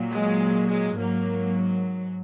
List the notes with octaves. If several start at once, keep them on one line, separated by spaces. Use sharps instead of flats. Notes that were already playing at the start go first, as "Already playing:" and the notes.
Already playing: A#2 F#3
G#3
G#3
G#2 F#3 A#3